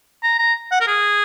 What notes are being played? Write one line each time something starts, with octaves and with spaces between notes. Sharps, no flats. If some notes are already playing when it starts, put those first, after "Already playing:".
A#5
A#5
F#5
A#4
G#4